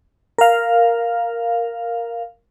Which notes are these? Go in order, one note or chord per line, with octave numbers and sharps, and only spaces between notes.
A#4 F5